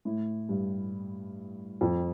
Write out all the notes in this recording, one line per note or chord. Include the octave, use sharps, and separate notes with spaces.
A2
G2
F2